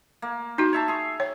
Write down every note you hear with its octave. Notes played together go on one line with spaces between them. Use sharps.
A#3
D#4 F#4 C5
C#5 E5 A5
G#4 C#6
C#5